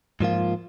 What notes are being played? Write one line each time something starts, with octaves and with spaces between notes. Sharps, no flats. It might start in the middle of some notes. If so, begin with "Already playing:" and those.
G#2 F3 A#3 F4